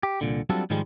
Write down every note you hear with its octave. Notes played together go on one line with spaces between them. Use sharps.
G4
C2 A#2 D3
F#3 G3 C4 D4 F4 A4
G#2 D#3 F3 G3 G#3